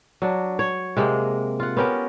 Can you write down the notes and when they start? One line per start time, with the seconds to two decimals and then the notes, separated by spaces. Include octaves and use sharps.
0.22 F#3 D4
0.59 C#5
0.97 C3 G#3 A#3
1.60 F4 F#5
1.77 B3 C#4 G4 A#4